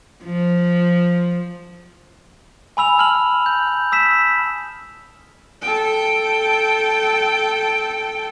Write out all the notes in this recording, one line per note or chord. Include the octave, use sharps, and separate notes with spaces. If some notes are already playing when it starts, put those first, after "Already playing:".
F3
G#5 B5 E6 F7
A5 F6 F#7
G6
D#6 E6 B6 E7
A4 G5